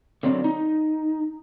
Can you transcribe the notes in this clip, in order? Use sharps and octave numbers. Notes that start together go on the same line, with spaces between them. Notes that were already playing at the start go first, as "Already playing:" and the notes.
D3 F#3 C4 D5
D#4